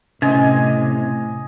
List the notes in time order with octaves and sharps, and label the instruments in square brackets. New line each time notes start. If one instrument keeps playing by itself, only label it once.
[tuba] A2 [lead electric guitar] C3 [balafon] C#4 [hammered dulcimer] D#5 G#5